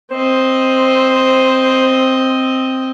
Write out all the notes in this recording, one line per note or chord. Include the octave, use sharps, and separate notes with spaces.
C4 C5 D#5